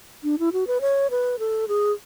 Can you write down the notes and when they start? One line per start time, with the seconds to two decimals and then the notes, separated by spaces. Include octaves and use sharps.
0.24 D4
0.39 E4
0.53 F#4
0.67 B4
0.81 C#5
1.10 B4
1.39 A4
1.68 G#4